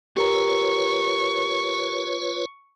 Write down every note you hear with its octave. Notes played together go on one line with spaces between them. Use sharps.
F4 G4 A#4 B4 C#5 A#5 C#6